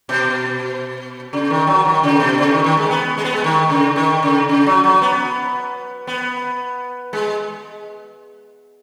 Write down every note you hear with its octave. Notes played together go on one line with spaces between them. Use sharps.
B2
C#3
D#3
F#3
D#3
C#3
B2
C#3
D#3
D#3
G#3
B3
G#3
B3
G#3
D#3
C#3
D#3
C#3
C#3
F#3
F#3
B3
B3
G#3